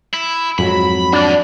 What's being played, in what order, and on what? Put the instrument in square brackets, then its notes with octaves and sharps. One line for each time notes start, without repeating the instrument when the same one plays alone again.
[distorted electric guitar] E4
[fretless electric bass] F2 G#2 F#3 [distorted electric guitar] B5
[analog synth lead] D4 [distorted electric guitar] F#4 D5